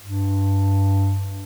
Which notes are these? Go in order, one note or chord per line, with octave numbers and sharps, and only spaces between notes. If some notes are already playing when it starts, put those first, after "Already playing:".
G2